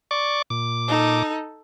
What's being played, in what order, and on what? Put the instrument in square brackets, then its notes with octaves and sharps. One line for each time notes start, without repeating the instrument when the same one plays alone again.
[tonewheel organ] D5 C#6 D6
A#2 D6
[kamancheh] D#4 A4